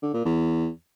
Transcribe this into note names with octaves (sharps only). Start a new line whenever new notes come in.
D3
A#2
E2